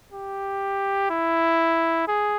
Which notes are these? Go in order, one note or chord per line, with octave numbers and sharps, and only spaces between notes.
G4
E4
G#4